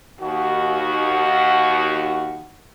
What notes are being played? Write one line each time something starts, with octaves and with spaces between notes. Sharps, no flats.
D#2 F#4